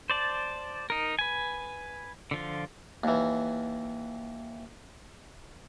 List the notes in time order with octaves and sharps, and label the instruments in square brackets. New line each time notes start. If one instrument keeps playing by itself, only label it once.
[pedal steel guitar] C5 D5 A5
D#4 A#4
B4 G#5
D3 F3 F4
[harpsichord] D#2 E3